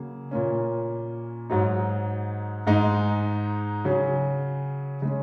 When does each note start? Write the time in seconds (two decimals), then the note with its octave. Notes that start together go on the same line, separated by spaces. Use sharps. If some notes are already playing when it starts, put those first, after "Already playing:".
Already playing: C#3 F#3 A#3
0.31 A#2 A#3 C#4
1.50 G#2 F#3 D#4
2.67 G#2 G#3 D#4
3.85 C#3 F#3 C#4
5.02 C#3 G#3 C#4